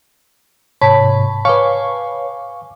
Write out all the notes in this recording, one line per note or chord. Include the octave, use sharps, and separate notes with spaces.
G#2 C3 C#5 A5 B5 B6
B4 C#5 F5 G#5 C#6 D6